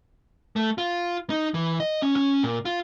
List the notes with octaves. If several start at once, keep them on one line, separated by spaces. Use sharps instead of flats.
A3
F4
D#4
E3
D#5
C#4
C#4
A#2
F4